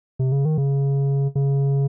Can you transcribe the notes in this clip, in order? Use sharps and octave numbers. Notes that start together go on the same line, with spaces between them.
C3
C#3
D#3
C#3
C#3